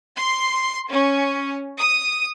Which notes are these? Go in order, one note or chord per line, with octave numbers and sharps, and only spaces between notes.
C6
C#4
D#6